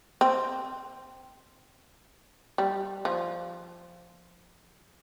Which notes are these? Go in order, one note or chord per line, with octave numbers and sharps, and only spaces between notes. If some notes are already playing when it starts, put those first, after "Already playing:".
C4
G3
F3